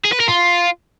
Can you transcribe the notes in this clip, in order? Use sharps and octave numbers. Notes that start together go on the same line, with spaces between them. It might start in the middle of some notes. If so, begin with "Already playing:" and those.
G#4
B4
A#4
F4